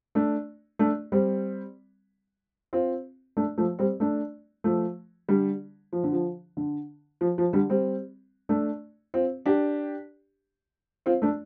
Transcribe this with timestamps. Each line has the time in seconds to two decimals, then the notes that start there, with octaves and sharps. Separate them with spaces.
0.15 A3 D4
0.79 A3 D4
1.12 G3 C4
2.73 C4 F4
3.37 A3 D4
3.58 F3 A3
3.79 G3 C4
4.00 A3 D4
4.64 F3 A3
5.29 D3 G3
5.93 F3
6.04 D3
6.12 F3
6.57 D3
7.21 F3
7.38 F3
7.53 D3 G3
7.70 G3 C4
8.49 A3 D4
9.14 C4 F4
9.46 D4 G4
11.06 C4 F4
11.22 A3 D4